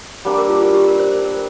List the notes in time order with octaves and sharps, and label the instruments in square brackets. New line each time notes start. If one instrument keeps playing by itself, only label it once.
[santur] G3 A#3 D4
[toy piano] A#4
F4
F4
G4
A#4
C5
C5
A#4